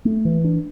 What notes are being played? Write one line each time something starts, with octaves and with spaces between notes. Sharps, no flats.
A3
E3
D4